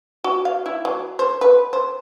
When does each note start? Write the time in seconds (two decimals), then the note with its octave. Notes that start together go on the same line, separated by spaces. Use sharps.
0.24 F#4
0.45 F5
0.66 E4
0.85 F#3
1.19 C5
1.41 B4
1.73 C5